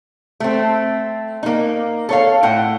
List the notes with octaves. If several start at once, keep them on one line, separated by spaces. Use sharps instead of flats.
A3 C4
A#3 D#4
A4 C#5 F5
A2 F#5 G5